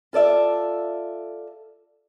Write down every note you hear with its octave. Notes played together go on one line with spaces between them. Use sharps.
F4 A4 D5 E5